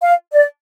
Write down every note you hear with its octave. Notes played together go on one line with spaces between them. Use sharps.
F5
D5